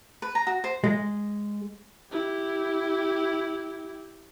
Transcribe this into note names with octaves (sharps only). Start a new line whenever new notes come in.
B4
A#5
F#4
C5
G#3
E4 G4